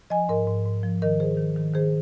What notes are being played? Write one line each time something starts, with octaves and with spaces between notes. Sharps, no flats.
F3 D#5 G#5
G#2 A#4 D#5
G#2
G#2
F3
D#3 A#4 D#5
D#3 G#4 C5
D#3
D#3
D#3 G#4 C5